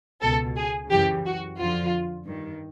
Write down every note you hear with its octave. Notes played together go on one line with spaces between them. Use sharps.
C#2 B2 A4
G#4
F#2 C#3 E3 G4
F#4
F2 D3 F3 F4
G2 D#3